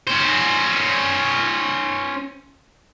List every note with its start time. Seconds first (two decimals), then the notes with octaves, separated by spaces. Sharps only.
0.07 C#4 C5